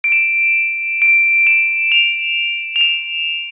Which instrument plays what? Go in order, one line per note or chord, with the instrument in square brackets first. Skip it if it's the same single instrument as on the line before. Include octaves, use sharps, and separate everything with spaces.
[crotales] D7
E7
D7
E7
F7
F7
E7